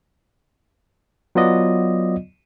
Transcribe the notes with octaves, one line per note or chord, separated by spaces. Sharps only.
F#3 B3 F4 D5 D#5